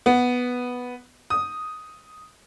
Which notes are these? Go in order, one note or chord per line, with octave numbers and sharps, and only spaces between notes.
B3
D#6